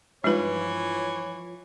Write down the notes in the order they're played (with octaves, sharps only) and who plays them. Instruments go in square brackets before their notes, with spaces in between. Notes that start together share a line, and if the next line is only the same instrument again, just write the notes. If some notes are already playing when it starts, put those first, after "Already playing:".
[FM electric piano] G2 F3 F4 [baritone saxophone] E3 [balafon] G#3 D#4 B4 [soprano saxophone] C#5